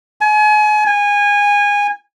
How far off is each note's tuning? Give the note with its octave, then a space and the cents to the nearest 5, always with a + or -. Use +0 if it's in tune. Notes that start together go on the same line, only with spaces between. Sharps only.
G#5 +35
G#5 -20